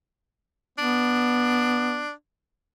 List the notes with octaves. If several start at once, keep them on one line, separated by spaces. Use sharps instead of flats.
B3 D4